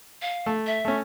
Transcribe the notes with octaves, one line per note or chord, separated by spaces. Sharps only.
F5
A3
E5
A3 C#4